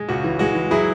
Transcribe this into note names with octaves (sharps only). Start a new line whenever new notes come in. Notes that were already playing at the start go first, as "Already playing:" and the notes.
Already playing: G#3
C#2 F#4
E3
G#3 F#4
E3
F#3 E4 G#4